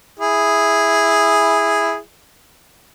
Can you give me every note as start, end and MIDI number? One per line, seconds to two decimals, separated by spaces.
0.20 1.98 64
0.20 1.98 68